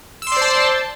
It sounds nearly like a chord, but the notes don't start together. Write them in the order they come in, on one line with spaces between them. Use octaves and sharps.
E6 C6 D5 C5 A5